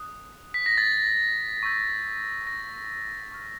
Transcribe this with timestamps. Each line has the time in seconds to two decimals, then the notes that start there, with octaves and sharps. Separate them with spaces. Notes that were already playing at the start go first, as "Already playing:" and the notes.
Already playing: D#6 F#6
0.54 B6
0.66 A#6
0.78 A6
1.63 C#6 E6 G6
2.47 A#6
3.32 C#6 F6